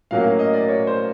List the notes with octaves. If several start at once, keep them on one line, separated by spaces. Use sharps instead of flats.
A2 F#3 A#3 C#4 F5
F5
D#5
D5
C#5
C5